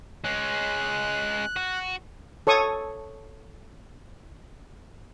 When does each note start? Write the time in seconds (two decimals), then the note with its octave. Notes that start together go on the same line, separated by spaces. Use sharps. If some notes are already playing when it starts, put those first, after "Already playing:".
0.24 G#3 C#4 F#6
1.56 F#4
2.47 A4 C#5 C#6 D#6